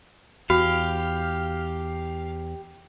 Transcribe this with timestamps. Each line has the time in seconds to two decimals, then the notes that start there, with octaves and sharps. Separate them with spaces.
0.50 E2 F#4 G4 F5